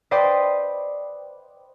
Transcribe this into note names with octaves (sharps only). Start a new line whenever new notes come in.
B4 C5 D5 D#5 G5